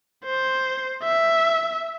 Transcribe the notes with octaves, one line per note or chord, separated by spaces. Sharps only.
C5
E5